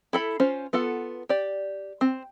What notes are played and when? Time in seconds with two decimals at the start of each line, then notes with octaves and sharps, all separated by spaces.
0.13 E4 A4 B5
0.40 C#4 F4 C5
0.73 B3 F4 A4 F#5
1.29 G4 D5
2.01 C4